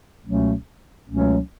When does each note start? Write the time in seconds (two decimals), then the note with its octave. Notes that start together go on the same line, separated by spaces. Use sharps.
0.24 C#2 B2 F#3 A3 C#4
1.08 C#2 B2 F#3 A3 C#4